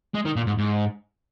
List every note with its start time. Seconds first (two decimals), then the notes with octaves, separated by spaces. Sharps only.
0.14 G#3
0.25 D#3
0.36 A#2
0.47 G#2
0.58 G#2